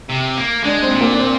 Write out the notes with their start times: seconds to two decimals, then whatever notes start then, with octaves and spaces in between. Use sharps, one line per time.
0.10 C3
0.38 A#3
0.64 G#3 D4
0.82 C4
0.91 A#2
1.01 A#3
1.13 D4
1.19 C4